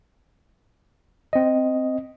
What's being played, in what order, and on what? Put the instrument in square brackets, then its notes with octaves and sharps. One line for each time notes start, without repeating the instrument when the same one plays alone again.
[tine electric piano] C4 D#5